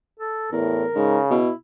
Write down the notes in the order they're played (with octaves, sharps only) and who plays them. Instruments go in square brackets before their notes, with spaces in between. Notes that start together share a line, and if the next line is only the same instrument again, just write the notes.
[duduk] A4
[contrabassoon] E2 [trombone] A2 [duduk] A#4
[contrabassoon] G#2 [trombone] C#3
[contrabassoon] B2 [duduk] E4